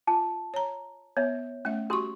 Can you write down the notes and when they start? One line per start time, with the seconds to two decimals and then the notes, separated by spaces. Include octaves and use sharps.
0.07 F4 A5
0.54 C#5 A#5
1.17 B3 C#5 E5
1.65 A3 C#4 E5
1.90 F#4 G4 C6 C#6 D#6